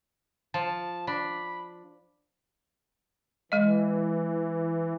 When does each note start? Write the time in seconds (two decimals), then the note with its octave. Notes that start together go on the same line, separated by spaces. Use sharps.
0.54 F3 A5
1.07 D4 B5
3.52 E3 G#3 D#5